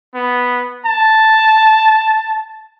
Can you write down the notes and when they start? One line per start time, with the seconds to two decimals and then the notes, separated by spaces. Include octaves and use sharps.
0.15 B3
0.86 A5